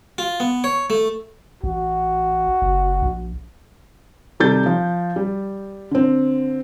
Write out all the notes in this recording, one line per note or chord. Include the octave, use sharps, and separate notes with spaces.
F4
B3
C#5
A3
A1 F#4
F#1
A#1
C3 D#3 G3 A4 G6 A6
F3
G3
D3 C4